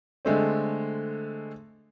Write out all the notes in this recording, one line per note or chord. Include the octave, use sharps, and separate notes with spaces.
D3 G#3 A3 C4